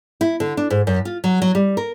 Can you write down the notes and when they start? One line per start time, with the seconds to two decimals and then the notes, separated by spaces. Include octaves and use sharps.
0.21 E4
0.40 D3
0.57 D4
0.70 G#2
0.87 F#2
1.05 F4
1.24 F#3
1.42 F#3
1.55 G3
1.77 A#4